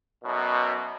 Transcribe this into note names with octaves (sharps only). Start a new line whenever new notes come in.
B1 F#2 B2